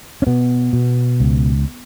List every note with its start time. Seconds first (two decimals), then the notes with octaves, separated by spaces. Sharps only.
0.22 C#4
0.27 B2 B3
0.73 B2
1.20 C#2